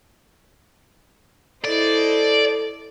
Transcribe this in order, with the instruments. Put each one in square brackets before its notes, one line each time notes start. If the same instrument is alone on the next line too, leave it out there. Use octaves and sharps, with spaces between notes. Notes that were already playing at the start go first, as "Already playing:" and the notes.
[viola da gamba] E4 C5 D#5 [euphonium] A4 [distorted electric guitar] D5